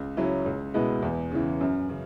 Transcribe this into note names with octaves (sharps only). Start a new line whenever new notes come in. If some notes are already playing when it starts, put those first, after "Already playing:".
Already playing: C#2
C#3 F#3 C#4 E4
C#2
B2 G#3 B3 E4
E2
C#3 E3
F#2
C#3